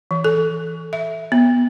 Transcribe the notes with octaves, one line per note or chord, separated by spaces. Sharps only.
E3
A4
E5
B3